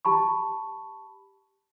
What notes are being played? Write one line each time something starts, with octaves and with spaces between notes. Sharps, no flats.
G4 A5 B5 C#6